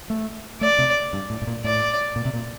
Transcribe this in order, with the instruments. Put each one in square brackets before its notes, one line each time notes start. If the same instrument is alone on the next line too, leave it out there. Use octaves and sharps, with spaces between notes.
[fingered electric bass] A3
[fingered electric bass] A3 [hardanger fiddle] D5
[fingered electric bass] C3
G2
A2
A2
A#2
[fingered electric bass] A2 [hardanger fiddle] D5
[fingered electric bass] A#2
C3
A#2